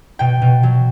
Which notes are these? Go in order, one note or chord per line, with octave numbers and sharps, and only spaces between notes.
B2 G5
B2
F#3